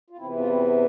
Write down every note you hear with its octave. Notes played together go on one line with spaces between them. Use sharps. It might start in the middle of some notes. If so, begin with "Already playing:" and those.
F4
E2 C3 E3 C4 E4
F4
C4 E4